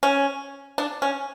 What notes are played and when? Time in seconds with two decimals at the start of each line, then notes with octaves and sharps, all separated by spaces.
0.03 C#4
0.78 D4
1.02 C#4